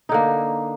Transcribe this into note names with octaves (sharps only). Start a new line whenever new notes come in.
D3 A#3 D#4